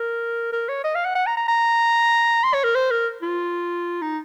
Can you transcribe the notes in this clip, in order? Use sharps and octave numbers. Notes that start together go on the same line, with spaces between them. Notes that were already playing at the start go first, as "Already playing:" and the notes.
Already playing: A#4
A#4
C#5
D#5
F5
F#5
F#5
A#5
A#5
A#5
C6
C#5
A#4
C5
A#4
F4
D#4